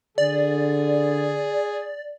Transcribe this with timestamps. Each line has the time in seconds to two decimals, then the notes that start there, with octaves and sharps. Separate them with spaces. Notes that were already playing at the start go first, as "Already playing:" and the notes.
0.18 D3 G#4 D5